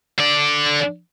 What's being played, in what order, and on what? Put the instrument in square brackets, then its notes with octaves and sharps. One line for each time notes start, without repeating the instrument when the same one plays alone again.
[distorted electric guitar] D3 D5